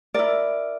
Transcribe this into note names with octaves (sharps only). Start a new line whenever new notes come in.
E4 A#4 D5